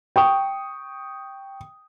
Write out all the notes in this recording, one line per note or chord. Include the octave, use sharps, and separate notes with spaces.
G5 C#6 D#6